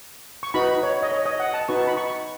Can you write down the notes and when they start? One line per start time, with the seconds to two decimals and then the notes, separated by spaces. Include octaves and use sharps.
0.43 C#6
0.54 D#4 F#4 B4 B5
0.83 C#5
1.02 D#5
1.12 C#5
1.25 D#5
1.40 F#5
1.54 A5
1.68 D#4 F#4 B4 C#6
1.78 A5
1.87 B5
1.97 C#6